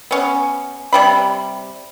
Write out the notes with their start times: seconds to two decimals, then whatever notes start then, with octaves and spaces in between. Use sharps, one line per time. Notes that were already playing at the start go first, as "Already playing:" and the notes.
0.11 B3 C#4
0.93 C3 G3 B5